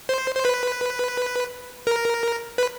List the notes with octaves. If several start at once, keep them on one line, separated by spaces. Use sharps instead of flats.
C5
C5
B4
A#4
B4